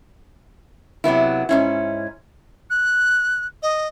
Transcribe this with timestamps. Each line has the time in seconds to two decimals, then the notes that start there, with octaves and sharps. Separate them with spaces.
1.04 C3 F#3 B3 E4
1.49 G#2 C#4 E4
2.70 F#6
3.63 D#5